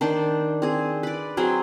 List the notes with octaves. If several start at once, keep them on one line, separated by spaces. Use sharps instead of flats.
D#3 D4 C5 D5
C4 G#4
B4 D5
F#3 C4 G#4